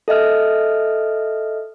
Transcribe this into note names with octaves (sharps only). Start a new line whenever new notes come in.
A4 D#5 E5 F6